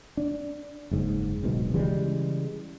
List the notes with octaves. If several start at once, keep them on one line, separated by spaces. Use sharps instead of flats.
D4
F#1 G#2
D1 B1 G#2 B2
C#3 E3 G3 G#3